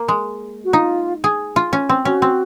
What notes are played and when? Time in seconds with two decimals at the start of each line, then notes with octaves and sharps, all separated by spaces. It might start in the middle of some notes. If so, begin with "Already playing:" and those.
Already playing: A#3
0.08 G#3
0.65 F#4
0.73 D#4 F4
1.24 G#4
1.56 F4
1.73 C#4
1.89 C4
2.05 C#4 F#4
2.22 C4